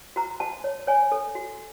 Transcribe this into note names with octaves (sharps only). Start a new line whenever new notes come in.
F#4 A#5
F#4 A5
C#5
C#5 G#5
A4
F#4